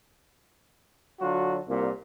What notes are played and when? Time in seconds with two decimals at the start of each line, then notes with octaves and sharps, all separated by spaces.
1.20 D3 F#3 F4 F#4
1.68 C2 A#2